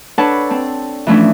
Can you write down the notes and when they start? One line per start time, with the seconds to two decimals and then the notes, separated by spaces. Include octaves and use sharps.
0.18 D4 A4 B4 C#5 F#5 A5
0.51 C4 A5
1.07 E3 F3 A3 C#4 D4 E4